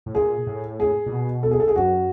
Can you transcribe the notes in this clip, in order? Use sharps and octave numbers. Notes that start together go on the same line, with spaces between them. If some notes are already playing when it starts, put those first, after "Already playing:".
A2
A#2 G#4
A2
G#4
A#2
B2
A4
G#4
A4
G#4
F#2 F#4